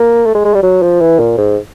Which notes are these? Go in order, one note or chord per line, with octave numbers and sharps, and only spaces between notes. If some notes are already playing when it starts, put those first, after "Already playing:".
Already playing: A#3
A3
G#3
G#3
G3
F#3
F3
E3
A#2
G#2